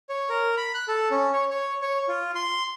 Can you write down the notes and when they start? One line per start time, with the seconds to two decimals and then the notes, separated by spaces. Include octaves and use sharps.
0.09 C#5
0.29 A#4
0.57 B5
0.74 F#6
0.88 A4
1.11 C#4
1.33 C#5
1.51 C#5
1.82 C#5
2.08 F4
2.35 C6